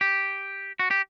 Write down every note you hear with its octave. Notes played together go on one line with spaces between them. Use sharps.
G4
F#4
G4